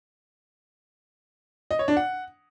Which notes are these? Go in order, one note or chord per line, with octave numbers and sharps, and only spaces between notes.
D#5
C#5
D4
F#5